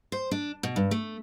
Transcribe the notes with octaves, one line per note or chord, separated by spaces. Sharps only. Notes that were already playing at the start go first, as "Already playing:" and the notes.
C5
D4
B2
G2
A3